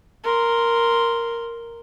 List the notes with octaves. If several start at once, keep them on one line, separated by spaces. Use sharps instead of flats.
A#4 C6